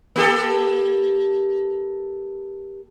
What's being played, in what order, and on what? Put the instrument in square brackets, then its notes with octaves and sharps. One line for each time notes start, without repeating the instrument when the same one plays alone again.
[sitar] A#3 G4 A4